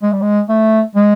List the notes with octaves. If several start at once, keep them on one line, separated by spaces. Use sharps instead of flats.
G#3
G3
G#3
A3
G#3